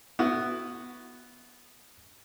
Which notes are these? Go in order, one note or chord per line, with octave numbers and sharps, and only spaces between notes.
B3 E4 F#4